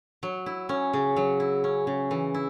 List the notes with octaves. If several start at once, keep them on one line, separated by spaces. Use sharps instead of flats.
F#3
E4
C#4
C#3
F#3
E4
C#4
C#3
E3
E4